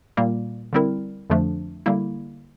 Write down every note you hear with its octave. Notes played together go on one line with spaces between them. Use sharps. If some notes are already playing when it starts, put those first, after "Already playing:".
A#2 G3 A#3
D3 G3 C4 E4 A#4
F2 D3 F3 A3 D4
D3 G3 A#3 E4